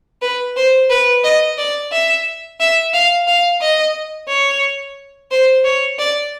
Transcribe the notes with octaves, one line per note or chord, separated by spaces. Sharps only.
B4
C5
B4
D#5
D5
E5
E5
F5
F5
D#5
C#5
C5
C#5
D5